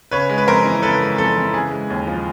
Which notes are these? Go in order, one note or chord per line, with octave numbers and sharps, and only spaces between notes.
C#3 B4 C#5
G#3
B4
F2 A#4 C5
E3
C#3 A4 B4
G#3
F2 A4
E3
C#3 G#4
G#3
D#2
F3